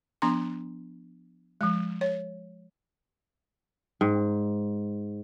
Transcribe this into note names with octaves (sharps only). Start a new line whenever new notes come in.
F3 B3 D4 A#5 C6
F3 G#3
C#5
G#2